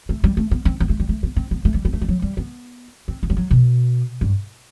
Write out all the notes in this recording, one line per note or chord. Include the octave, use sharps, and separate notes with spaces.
A3
G3
A3
B3
C4
B3
A3
G3
A3
B3
C4
B3
A3
G3
B3
A3
G3
F#3
G3
B3
C4
B3
G3
F#3
B2
G2